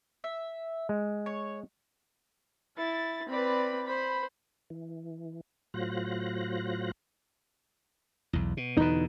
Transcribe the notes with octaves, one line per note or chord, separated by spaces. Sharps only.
E5
G#3
C#5
E4 A6
C4 B4 D5 B5
C5 B5
E3
A2 F#3 F4 C5 F#6 A#6
B1 E2
B2
E2 B2 D3 D#4 B4